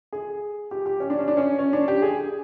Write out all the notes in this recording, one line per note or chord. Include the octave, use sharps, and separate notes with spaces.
G#4
G4
G4
C#4
D4
C#4
D4
C#4
C#4
D4
G4
G#4